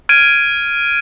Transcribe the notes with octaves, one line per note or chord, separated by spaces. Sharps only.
F6 G#6 D7 D#7